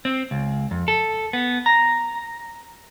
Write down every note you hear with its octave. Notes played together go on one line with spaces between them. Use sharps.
C4
C#2
F2
A4
B3
A#5